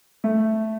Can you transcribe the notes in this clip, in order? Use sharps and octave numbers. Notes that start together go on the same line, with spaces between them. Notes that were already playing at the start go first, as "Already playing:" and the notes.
A3